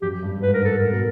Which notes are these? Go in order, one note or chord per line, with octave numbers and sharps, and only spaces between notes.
F#2 G4
G2
G#2 B4
A#4
G#2
A4
G#2 A#4
B2